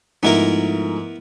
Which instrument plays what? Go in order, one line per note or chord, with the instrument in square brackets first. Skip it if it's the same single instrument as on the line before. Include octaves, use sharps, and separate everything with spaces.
[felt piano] G#2 F3 A3 [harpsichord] B3 E4 A#4